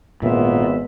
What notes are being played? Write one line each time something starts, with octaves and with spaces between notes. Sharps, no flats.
G#1 A#2 B3 F4 E5